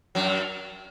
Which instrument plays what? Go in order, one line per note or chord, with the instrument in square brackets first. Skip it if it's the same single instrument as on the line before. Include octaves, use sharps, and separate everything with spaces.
[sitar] F#2 F#3